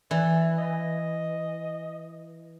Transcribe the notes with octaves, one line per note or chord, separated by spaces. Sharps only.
E3 D5
D#5